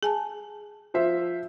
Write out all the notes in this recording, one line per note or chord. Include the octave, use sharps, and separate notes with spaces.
G#4 G#5 A5
F3 C5 E5